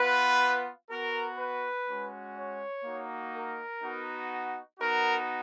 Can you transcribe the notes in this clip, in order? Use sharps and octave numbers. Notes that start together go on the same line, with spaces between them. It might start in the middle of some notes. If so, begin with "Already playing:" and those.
Already playing: B3 F4 B4
B3 F#4 A#4
B4
G#3 C#4 F#4
C#5
A#3 D#4 F#4
A#4
B3 D#4 F#4
B3 D#4 F#4 A#4